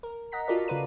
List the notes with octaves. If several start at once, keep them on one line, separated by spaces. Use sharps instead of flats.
A#4
D#5 F#5 A#5 B6
F4 F#4 A4 A#4 D5
C#3 F4 B4 D#7